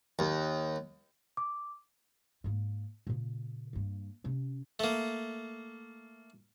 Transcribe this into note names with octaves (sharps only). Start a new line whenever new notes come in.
D#2
D6
G#2 A#3
A#2 C#3
G2 A#3
C3 C#4
A3 A#3